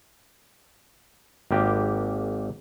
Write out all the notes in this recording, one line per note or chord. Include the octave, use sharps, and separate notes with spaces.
G#1 A#3 G4 G5